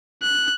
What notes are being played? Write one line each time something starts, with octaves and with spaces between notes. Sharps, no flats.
F#6